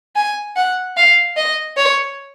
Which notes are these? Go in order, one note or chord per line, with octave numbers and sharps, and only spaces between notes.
G#5
F#5
F5
D#5
C#5